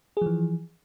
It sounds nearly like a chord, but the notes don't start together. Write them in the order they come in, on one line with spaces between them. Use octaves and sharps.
G#4 F3 E3